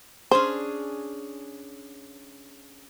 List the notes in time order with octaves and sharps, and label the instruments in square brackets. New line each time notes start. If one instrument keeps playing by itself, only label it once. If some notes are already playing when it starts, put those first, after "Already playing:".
[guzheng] C#4 D4 G#4 [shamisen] C5